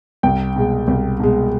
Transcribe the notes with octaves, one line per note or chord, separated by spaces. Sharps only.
C2 G5
B2 G#3
C2
B2 G#3